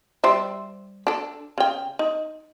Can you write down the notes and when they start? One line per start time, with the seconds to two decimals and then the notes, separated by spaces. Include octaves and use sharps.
0.24 G3 C5 E5
1.07 D4 A4
1.58 C#3 G5
1.99 D#4